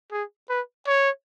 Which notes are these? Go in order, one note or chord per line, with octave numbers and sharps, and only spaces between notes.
G#4
B4
C#5